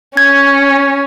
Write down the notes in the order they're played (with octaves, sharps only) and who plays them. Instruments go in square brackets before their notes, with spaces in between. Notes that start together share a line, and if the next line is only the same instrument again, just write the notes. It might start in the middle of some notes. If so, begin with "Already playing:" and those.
[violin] C#4 [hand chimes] G#6